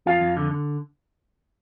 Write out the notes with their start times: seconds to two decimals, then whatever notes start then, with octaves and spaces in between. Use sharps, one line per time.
0.06 F2 F4 F5
0.21 F2
0.37 D3
0.51 D3